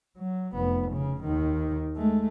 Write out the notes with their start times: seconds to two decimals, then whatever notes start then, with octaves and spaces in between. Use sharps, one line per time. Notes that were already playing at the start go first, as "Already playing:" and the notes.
0.17 F#3
0.53 F1 B3
0.92 C#3
1.23 D#2 D#3
1.96 G#3 A3